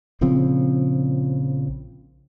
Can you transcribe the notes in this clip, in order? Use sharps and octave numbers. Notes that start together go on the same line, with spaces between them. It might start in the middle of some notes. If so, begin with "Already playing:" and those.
A#1 C#3 F3 C4